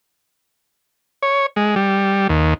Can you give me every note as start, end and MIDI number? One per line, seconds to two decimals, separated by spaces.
1.23 1.46 73
1.56 1.75 56
1.76 2.28 55
2.29 2.54 39